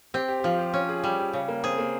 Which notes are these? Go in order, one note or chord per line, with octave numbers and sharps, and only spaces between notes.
C4 G4
G4
G4
F3 F4
G4
C#4 F4
G#4
G3 G4
G4
C#3 G4
A#3
C4 G#4
A#3